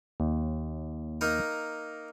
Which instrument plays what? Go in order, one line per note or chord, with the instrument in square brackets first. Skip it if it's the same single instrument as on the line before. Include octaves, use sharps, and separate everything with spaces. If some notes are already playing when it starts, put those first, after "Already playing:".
[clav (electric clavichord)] D#2
[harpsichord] A#3 D#4 A#4